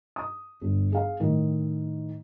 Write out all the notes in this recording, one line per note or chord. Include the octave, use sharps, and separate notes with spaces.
D#6
G1
G#4 F5
A2 D#3